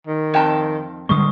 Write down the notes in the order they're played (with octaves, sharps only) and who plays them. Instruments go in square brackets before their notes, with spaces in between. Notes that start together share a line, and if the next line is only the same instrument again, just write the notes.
[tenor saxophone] D#3
[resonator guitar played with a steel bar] F2 G5 A5
[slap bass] D3 G3 G#3 [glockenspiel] C#6 D#6